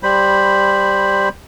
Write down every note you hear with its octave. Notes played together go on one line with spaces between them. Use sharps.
G3 C5 B5